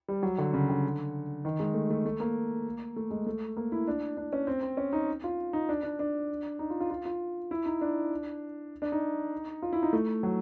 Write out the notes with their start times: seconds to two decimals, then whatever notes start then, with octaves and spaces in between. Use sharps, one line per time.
0.08 G3
0.23 F#3
0.38 D3
0.53 C#3
0.69 D3
1.45 D#3
1.59 G#3
1.74 A3
1.90 A3
2.06 A3
2.20 A#3
2.96 A3
3.11 G#3
3.27 A3
3.57 A#3
3.72 E4
3.87 D4
4.17 D4
4.33 C#4
4.47 C4
4.63 C4
4.77 C#4
4.93 D#4
5.24 F4
5.53 D#4
5.69 D4
5.83 D4
5.99 D4
6.59 D#4
6.70 F4
6.80 F4
6.91 F4
7.05 F4
7.51 E4
7.66 D#4
7.81 D4
8.82 D4
8.92 D#4
9.62 F4
9.73 E4
9.83 D#4
9.93 A3
10.23 F#3